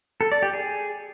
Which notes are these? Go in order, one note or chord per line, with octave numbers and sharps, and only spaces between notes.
A4
D5
G4
G#4